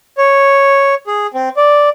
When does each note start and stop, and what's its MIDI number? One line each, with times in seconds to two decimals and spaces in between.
0.18 0.95 73
1.07 1.27 68
1.34 1.49 60
1.57 1.89 74